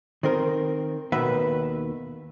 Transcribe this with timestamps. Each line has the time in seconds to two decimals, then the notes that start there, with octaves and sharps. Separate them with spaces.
0.23 D#3 C4 A#4
1.12 D#2 B2 D#3 B4 E5